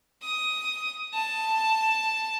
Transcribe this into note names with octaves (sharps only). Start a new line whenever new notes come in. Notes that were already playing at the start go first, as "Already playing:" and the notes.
D#6
A5